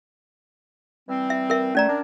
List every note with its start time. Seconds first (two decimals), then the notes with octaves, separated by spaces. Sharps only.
1.09 E3 G3 C4
1.30 E5
1.50 A#4 E5
1.75 A3 C#4 D5 A#5
1.89 D4 A#4